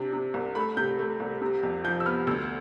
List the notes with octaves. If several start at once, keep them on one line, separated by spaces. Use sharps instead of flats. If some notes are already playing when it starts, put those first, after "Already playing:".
Already playing: C3 D4
C3
C2
A3 B5
C3 G6
A3
C2
C3
F2
F3 G6
E6
B3 F6
D2 E6